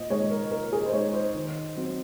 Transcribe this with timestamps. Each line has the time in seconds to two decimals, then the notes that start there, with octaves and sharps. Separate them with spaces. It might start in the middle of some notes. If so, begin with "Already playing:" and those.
Already playing: A#2 D#5
0.10 G#3 D#4 C#5
0.31 A#4
0.51 A#2 A#4
0.72 G#4
0.86 C5
0.93 G#3 D#4 C#5
1.14 C5
1.34 D#3
1.76 F#3 C4